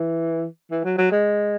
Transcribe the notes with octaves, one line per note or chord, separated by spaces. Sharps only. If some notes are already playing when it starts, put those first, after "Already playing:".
Already playing: E3
E3
F#3
F#3
G#3